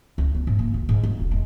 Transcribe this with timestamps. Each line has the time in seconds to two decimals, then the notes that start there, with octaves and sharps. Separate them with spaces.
0.18 C#2
0.35 B3
0.47 G#2
0.59 A#3
0.74 D2
0.89 G#2
1.03 C2
1.19 E1
1.31 G#3